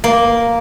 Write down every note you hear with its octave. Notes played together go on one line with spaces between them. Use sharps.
A#3